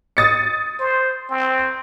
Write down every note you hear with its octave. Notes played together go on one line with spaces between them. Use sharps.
D#6 A6 C#7
C5
C4